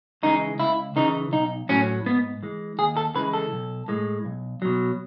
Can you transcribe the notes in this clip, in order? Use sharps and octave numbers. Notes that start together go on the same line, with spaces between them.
C#3 E3 G#3 D#4
C#2 E4
C#3 E3 D#4
B1 D#4
A2 F#3 C#4
G#2 B3
E3 G#3
D#2 G#4
A4
C#3 E3 G#3 B4
A4
B1
A2 G#3
B1
B2 F#3